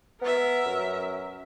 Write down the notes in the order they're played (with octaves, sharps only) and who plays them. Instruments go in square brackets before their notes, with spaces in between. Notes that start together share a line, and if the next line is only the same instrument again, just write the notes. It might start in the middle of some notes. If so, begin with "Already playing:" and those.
[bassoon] B3 [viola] A#4 E5
[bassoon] F#2